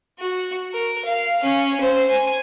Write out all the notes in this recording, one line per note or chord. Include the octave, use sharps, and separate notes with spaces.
F#4
A#4
F5
C#4
C5
G#5